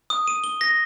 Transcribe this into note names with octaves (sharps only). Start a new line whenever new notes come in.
D#6
D#7
G7
A#6